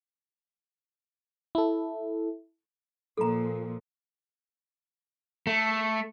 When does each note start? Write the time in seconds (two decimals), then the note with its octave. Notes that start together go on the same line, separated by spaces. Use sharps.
1.55 E4 A4
3.18 A#2 F3 A4 A#5
5.47 A3